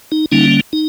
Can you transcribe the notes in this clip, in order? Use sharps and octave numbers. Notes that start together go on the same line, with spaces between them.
D#4
D3 G3 A#3 C#4 D#4
D#4